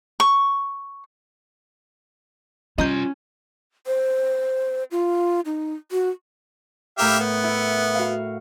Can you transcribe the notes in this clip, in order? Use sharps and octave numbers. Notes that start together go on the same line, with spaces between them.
C#6
G3 C#4 F4 D#5 G#5 A#5 G6
C5
F4
D#4
F#4
A2 G4 A#4 E5 F5 G6
B3
E4
F#4 F5